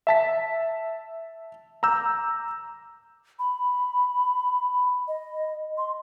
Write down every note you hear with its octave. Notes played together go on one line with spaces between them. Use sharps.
E5 A5 B6
A#5 D6 E6 G6
B5
D#5
C6